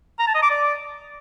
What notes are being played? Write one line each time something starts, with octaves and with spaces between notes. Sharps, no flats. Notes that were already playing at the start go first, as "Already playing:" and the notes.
A#5
A5
D#5
D6
D5